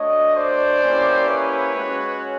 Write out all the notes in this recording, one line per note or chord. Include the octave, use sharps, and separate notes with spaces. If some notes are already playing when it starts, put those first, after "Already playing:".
Already playing: A3 D4 F#4 C#5 D#5
C5 D5
A#3 C#4 E4 G4
B4 C#5
G#3 C#4 F#4